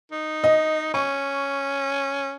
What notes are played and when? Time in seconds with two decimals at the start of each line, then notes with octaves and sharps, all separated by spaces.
0.12 D#4
0.44 D#5
0.94 C#4 C#6